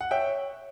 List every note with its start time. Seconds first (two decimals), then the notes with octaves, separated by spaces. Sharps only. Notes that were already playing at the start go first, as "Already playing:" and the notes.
0.01 F#5
0.11 C#5 E5 G5